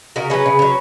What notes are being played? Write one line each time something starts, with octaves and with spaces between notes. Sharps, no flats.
C#3 F#4 A#4
F#3 C#4 G#4 B4
C#3
F#3 C#4